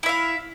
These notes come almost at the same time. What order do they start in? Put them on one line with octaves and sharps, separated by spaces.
E4 E5 F5